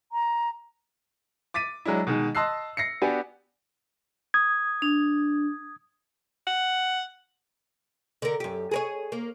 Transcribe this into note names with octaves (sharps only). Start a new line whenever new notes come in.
A#5
D6 A6 B6 D#7
F#3 G#3 D4 E4
B2 D#3 G#3
D#5 A5 C6 E6 F#6 C7
A#6 C7 C#7
B3 D4 F#4 G4 G#5
D#6 G#6
D4
F#5
D3 A#4
F#2 G4
G#4 A#4 C#5
A#3